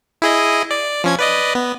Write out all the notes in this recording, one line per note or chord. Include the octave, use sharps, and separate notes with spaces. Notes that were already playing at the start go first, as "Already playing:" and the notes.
E4 G#4 D#5
D5
F3 C#4 G#6
B4 D5 D#5
B3